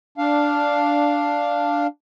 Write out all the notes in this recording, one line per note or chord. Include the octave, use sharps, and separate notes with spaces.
D4 F5